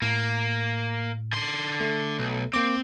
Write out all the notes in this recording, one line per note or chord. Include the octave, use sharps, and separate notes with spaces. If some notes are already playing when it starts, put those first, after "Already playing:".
A2 A#3
D3 C6
A3
B1
A#3 C4 D6